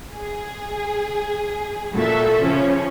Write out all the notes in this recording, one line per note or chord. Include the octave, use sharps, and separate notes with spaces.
G#4
A#2 F#4 A4 E5
C#3 F3 C#4